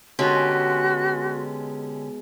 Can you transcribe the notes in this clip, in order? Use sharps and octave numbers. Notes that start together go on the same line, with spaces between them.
B2 D3 G#3 C#4 F#4 G4